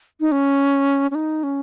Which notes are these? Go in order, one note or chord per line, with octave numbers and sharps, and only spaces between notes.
D#4
C#4
C#4
D#4
C#4